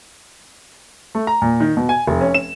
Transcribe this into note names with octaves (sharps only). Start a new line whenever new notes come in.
A3
A#5
A#2
D#3
B2
G#5
F1
C#4
E7